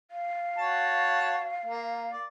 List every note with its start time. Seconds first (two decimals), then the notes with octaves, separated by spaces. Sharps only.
0.11 F5
0.58 F#4 C#5 A5
1.66 A#3
2.12 D5